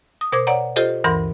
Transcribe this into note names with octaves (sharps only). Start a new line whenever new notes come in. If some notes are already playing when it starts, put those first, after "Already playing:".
D#6
B2 A#4 C5 D6 G#6
C#5 D5 F#5 A#5
F4 G4 A4 C5 D#5
D2 G2 E3 A#4 B5 C6